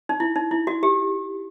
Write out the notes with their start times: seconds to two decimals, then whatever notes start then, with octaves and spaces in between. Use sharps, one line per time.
0.09 D#4
0.20 E4
0.36 D#4
0.51 E4
0.67 F#4
0.83 G4